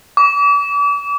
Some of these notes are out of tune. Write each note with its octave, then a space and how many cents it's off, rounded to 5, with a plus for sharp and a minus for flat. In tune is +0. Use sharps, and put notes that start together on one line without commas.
D6 -40